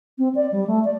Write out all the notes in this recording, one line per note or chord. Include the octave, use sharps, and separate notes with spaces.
C4
D5
G3
A3
D5